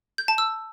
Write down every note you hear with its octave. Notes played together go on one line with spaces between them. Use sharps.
G6
A5
E6